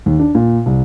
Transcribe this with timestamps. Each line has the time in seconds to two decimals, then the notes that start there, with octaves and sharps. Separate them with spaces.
0.06 D#2
0.19 D4
0.35 A#2
0.66 C2